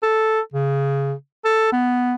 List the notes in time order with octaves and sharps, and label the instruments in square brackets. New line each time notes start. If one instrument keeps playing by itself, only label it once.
[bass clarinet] A4
C#3
A4
B3